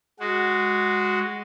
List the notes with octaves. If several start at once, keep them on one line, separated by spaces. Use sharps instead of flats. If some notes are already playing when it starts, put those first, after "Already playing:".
G#3 F#4